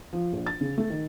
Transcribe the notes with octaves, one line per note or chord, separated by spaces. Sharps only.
F3
A#1
A6
C#3
A3
D#3